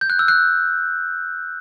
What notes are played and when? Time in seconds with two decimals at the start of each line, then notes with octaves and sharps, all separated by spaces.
0.01 G6
0.10 F#6
0.19 E6
0.28 F#6